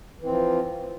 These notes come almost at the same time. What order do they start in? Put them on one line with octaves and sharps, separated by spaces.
E3 C4 F3